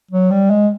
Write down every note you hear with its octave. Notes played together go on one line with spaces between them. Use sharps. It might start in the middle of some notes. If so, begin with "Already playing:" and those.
F#3
G3
G#3